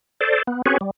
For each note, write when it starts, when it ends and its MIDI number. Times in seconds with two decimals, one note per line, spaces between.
0.21 0.42 69
0.21 0.42 72
0.21 0.42 74
0.47 0.62 59
0.66 0.78 60
0.66 0.78 61
0.66 0.78 66
0.66 0.78 68
0.66 0.78 71
0.66 0.78 73
0.81 0.91 55